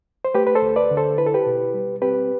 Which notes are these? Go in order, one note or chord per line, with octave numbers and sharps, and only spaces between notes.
C5
A3 G4 B4
B4
A4 C5
D2
B4 D5
D3
A4 C5
E4 B4
A4
G4 B4
B2
G3
C4 G4 B4